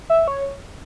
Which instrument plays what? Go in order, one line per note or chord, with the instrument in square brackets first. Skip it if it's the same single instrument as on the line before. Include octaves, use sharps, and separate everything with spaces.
[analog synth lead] E5
C#5